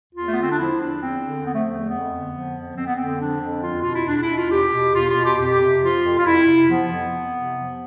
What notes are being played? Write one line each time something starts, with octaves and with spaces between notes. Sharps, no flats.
E2 F4
A3
D3 B3
C4
D4
F3 E4
E2 D4
E2 C4
D3
F3 B3
A3
E2 A3
F2 B3
D3
F3
F2
F2 C4
B3
D3 C4
F3 D4
F2
E2 F4
B2 F4
E4
E2 D4
E4
B2
F4
E2 G4
B2
E2 F4
F4
B2
G4
F2 G4
C3
F3 F4
F2
F4
F2 E4
C3
F3 B3
F2
F2
C3
F3